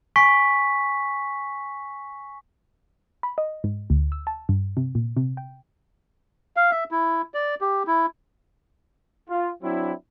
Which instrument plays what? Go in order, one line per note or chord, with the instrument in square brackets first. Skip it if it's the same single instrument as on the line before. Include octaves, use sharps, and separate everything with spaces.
[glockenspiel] G#5 C#6 B6
[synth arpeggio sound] B5
D#5
G#2
D2
E6
A5
G2
C3
A#2
C3
G5
[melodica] F5
E5
E4
D5
G4
E4
[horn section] F4
F#3 C4 D4 E4